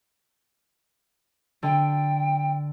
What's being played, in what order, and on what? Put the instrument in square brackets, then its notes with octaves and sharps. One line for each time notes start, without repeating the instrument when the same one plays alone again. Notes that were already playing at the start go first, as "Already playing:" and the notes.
[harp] D3 [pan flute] G5